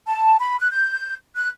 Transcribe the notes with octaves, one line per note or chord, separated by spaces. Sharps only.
A5
B5
F#6
G6
F#6